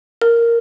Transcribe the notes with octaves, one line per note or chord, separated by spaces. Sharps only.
A#4